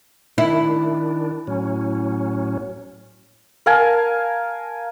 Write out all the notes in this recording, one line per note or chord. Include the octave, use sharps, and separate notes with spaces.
D#3 D4 E4
A2 F#3 C#4
A#4 F5 G#5 A5